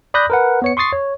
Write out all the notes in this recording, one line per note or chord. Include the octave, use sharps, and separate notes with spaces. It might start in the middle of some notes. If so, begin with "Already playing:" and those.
D5 B5 D#6 F#6 G6 A#6
A#4 B4 F#5
B3 C#5 C#7
C6 C#6 D#6 A6 C7
C#5